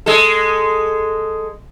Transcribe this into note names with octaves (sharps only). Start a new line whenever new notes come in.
G#3 A4